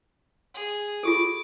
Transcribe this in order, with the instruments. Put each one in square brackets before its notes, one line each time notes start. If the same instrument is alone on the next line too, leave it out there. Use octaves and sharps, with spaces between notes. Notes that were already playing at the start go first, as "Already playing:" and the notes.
[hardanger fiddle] G#4
[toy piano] F4 G4 A4 [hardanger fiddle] D6